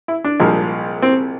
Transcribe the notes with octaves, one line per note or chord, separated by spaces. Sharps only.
E4
D4
C2 A#2 F3 G#3
C4